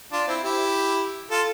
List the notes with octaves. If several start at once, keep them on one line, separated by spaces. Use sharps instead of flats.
D4 F4
C4 E4
E4 G4
F4 A4